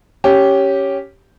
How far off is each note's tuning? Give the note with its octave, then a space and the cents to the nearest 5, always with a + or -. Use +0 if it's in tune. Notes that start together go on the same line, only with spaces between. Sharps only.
C#4 +0 G4 -5